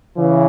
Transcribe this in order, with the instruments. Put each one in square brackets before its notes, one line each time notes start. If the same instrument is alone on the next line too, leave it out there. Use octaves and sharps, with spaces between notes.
[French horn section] C#3 E3